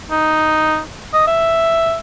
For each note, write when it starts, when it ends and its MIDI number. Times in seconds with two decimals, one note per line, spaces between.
0.11 0.80 63
1.14 1.26 75
1.28 1.98 76